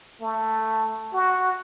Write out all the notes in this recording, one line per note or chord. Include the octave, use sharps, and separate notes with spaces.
A3
F#4